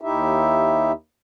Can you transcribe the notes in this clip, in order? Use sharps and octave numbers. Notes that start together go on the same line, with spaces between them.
D#2 D#4 E4 G4 E5